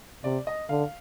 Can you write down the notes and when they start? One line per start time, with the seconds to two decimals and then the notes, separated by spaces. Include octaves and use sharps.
0.24 C3 D5
0.47 D#5
0.69 D3 F5